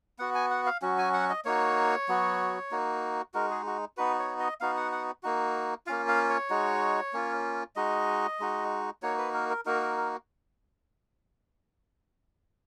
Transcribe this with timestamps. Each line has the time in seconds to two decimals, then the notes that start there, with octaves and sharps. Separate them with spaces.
0.19 B3 F#4 F#5
0.35 G#5
0.51 F#5
0.66 F5
0.82 F#3 C#4 F#4
0.98 G#5
1.14 F#5
1.29 D#5
1.45 A#3 D#4 F#4 C#5
2.08 F#3 B3 F#4
2.71 A#3 D#4 F#4
3.34 G#3 D#4 F#4 A#4
3.51 G#4
3.66 F#4
3.97 B3 D#4 F#4 B4
4.19 C#5
4.39 D#5
4.60 B3 D#4 F#4 F5
4.77 F#5
4.92 F#5
5.23 A#3 D#4 F#4
5.87 A#3 C#4 F4 F5
6.08 F5
6.29 C#5
6.50 G#3 D#4 F#4
7.13 A#3 C#4 F4
7.76 G#3 D#4 F#4 D#5
8.40 G#3 D#4 F#4
9.03 A#3 D#4 F#4 C#5
9.18 B4
9.34 A#4
9.50 A#4
9.66 A#3 D#4 F#4 A#4
9.82 A#4
9.97 A#4